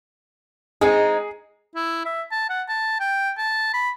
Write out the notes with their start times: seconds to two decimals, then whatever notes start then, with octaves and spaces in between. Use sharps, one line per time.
0.81 G#3 C4 D#4 G#4
1.75 E4
2.05 E5
2.31 A5
2.49 F#5
2.68 A5
3.00 G5
3.37 A5
3.73 B5